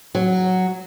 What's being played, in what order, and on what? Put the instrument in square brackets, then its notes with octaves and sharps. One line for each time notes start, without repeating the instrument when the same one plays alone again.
[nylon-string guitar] F#3